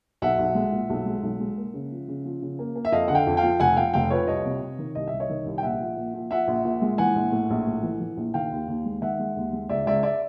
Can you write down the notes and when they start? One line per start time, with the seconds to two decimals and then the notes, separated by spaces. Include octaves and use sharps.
0.22 B1 E5 F#5
0.39 B1
0.55 G#3
0.72 A#2
0.90 B1
1.06 G#3
1.23 B1
1.40 G#3
1.57 A#3
1.74 C#3
1.92 F3
2.08 C#3
2.25 F3
2.42 C#3
2.59 A#3
2.76 A#3
2.85 E5
2.92 F2 D#5 F5
3.08 D3 F#5
3.15 F5 G5
3.27 F2
3.37 F5 G5
3.43 F3
3.60 F1 F#5 G#5
3.77 F3 F5 G5
3.93 F1 F5 G5
4.10 F3 B4 C#5
4.27 C2 C#5 D#5
4.45 C3
4.61 C3
4.79 D#3
4.95 C2 D#5
5.07 E5
5.13 C2
5.20 C#5 D#5
5.29 D#3
5.46 C2
5.58 G5
5.63 A#1 E5 F#5
5.81 F3
5.97 A#2
6.14 F3
6.31 F3 E5 F#5
6.47 A#1
6.65 A#2
6.82 G#3
6.98 E3 F#5 G#5
7.15 A#1
7.32 A2
7.50 A#1
7.67 A2
7.83 E3
8.00 E3
8.17 A#1
8.34 D#3 F5 G5
8.51 D#2
8.68 D#2
8.85 G#3
9.01 D#3 E5 F#5
9.19 G#3
9.36 D#2
9.53 G#3
9.69 C#2 D5 E5
9.86 C#2 D5 E5
10.03 D5 E5